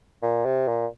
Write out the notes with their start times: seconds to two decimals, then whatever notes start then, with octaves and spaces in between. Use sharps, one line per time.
0.22 A#2
0.45 C3
0.68 A#2